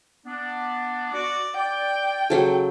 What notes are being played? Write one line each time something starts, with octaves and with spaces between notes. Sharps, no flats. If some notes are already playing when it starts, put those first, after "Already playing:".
B3 D4
F#4 D5
D5 G5
C#3 F#3 A4